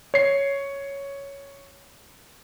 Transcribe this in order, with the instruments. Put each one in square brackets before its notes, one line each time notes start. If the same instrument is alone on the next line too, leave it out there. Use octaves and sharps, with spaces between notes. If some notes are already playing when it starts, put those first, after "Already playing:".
[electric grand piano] C#5 C7